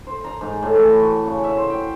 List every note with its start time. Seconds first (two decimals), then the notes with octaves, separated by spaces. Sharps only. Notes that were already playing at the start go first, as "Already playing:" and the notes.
0.07 C5
0.24 A#5
0.41 G#2
0.63 A2
0.75 E3
1.00 F#4
1.26 C#3
1.44 E5
1.57 C5
1.70 G5